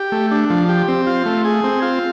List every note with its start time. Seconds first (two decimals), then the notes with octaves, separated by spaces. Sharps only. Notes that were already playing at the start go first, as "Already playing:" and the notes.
Already playing: G4
0.12 A3
0.31 D4
0.50 F3
0.69 G4
0.88 C4
1.07 F4
1.26 A3
1.45 G#4
1.64 C4
1.82 F4